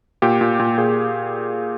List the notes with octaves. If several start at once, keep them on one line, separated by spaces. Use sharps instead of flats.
A#2 G4
A#2
A#2
A#2 G#4